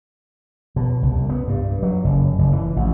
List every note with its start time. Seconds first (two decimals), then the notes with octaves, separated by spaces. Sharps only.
0.76 B2
1.02 C2
1.16 C2
1.29 B3
1.48 G2
1.83 F#3
2.04 F#1
2.39 F#1
2.53 E3
2.76 A1